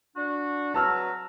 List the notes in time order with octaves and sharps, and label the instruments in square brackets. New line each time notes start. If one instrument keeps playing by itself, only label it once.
[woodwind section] D4 F#4
[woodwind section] F#3 B4 A#5 [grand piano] A5 E6 F6